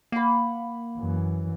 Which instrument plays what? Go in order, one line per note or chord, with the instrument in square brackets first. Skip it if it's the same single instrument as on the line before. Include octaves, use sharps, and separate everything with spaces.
[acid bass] A#3 [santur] F#5 B5
[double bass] F#2 E3